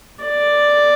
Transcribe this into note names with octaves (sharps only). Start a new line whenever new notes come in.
D5